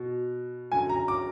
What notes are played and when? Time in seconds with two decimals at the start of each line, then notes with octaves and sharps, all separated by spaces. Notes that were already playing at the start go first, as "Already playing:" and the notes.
Already playing: B2
0.72 F#2 D3 F#3 G#5
0.89 A#5
1.08 D6